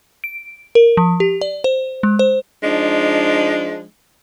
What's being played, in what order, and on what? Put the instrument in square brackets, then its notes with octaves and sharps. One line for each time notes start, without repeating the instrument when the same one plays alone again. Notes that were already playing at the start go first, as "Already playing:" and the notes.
[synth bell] D7
A#4
F3
G4
D5
C5
G#3
C5
[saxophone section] F3 G#3 D4 D#4